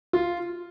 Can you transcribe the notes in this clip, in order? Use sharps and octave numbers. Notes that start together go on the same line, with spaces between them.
F4